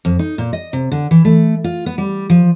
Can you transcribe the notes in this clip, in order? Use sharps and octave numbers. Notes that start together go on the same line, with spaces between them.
F2
D#4
A#2
D#5
C3
D3
E3
A3
F4
B3
G3
F3